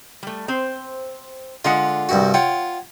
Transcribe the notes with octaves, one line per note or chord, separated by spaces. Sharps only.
G3 A3
C4 C5
D3 G#3 F4 F#5
C2 G2 F#4
F4 C#5 F#5 G5